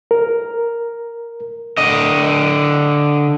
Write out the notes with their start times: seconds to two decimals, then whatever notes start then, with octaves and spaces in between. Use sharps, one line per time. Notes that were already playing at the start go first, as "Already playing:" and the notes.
0.11 A#4
1.78 D3 D#5